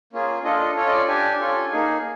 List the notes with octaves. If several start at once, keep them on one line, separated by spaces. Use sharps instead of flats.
A#3 C#4 F4 G#4
D4 F4 A4 D#5
D#5
C#4 F4 A4 C#5
D#5
D5
D4 G4 G#5
C#4 F4 A4
A#3 D#4 G#4